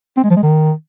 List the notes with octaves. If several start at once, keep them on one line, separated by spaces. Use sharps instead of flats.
C4
G#3
F3
G#3
D#3